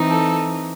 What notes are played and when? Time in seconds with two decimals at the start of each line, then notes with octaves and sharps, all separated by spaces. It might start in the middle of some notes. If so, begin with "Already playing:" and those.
Already playing: E3 C4 D#4
0.09 A4